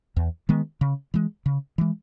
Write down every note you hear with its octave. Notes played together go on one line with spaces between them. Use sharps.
E2
D#3 G#3 B3
C#3
E3 G#3
C#3
E3 G#3